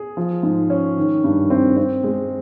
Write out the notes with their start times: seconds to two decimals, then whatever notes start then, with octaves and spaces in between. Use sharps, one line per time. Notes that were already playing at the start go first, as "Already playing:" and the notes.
Already playing: G#4
0.17 F3
0.43 G#2
0.70 C#4
0.97 D#3
1.24 G2
1.50 C4
1.77 C4
2.03 G#3